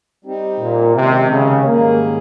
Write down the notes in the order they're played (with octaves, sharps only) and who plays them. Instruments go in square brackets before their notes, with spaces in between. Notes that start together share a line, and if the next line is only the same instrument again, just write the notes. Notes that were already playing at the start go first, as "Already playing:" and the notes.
[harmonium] G3 C4 D#4 G4
[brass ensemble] A#2
[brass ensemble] C3 [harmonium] D#3 G#3 C#4 G4
[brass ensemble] C#3
[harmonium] G#2 D#3 G3 C#4 G#4 [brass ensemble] A#3